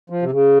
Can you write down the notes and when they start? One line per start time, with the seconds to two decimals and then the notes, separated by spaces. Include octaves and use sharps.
0.10 F3
0.22 C3
0.31 C#3